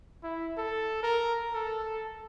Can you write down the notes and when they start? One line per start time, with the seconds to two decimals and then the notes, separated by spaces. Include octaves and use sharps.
0.23 E4
0.57 A4
1.03 A#4
1.54 A4